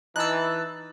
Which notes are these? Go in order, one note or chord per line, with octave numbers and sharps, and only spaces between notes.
E3 D#4 A5 E6 F#6